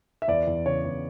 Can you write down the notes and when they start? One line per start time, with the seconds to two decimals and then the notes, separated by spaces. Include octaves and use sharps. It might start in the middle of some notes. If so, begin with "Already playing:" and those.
0.22 E5
0.28 E2 D5
0.47 E2
0.66 C#3 C#5
0.84 E2